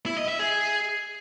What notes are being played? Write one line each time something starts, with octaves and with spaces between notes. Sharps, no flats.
E4
D#5
E5
G#4